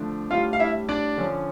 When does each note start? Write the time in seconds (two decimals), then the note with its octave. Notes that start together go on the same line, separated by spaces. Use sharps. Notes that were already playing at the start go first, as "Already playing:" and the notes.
Already playing: D3 F3 A3 D4
0.30 A2 G3 D4 F4 F5
0.53 F5
0.60 E4 E5
0.89 D4 D5
1.18 D3 F3 C#4